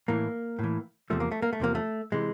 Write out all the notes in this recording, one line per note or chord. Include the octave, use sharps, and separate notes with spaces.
A2 E3 A#3
A2 E3
E2 C3 F3 A3
A#3
A3
A#3
A3
E2 C3 F3 A#3
A3
C3 E3 G#3